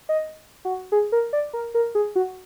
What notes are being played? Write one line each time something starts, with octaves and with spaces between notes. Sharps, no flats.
D#5
F#4
G#4
A#4
D5
A#4
A#4
G#4
F#4